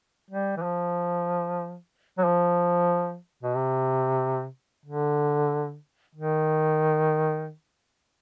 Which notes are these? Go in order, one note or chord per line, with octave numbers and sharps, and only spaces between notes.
G3
E3
F3
F#3
F3
B2
C3
D3
D#3